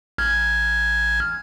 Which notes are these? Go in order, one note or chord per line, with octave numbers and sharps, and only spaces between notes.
A1 F6 G#6